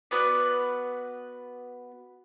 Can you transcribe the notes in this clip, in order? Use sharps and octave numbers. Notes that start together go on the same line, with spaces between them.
B3 F#4 B4 D5